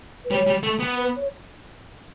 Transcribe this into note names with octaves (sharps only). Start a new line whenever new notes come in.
B4
G3 C#5
G3
A3
B3
B4
C#5